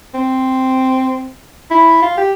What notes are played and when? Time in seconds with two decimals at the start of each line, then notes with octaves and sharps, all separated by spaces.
0.14 C4
1.70 E4
2.02 F4
2.17 G4